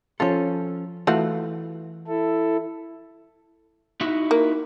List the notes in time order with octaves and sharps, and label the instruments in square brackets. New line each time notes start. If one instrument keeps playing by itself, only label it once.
[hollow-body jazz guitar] F3 C#4 A4 [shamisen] F4 C#5
[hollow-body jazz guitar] E3 [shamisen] A3 F4 F#4
[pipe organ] E4 A4
[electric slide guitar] D#4 E4 F#4
[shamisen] A#3